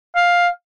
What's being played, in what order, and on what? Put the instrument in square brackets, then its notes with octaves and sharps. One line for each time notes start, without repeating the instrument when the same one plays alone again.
[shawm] F5